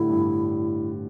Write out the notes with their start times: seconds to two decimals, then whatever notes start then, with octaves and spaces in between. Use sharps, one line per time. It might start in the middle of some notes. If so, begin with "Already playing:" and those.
Already playing: A2 D3 G3 A3 E4
0.10 G2